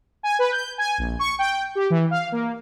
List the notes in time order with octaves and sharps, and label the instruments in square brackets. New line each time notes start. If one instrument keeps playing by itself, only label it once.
[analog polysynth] G#5
B4
G6
G#5
A#1
C#6
G5
G4
E3
F5
A#3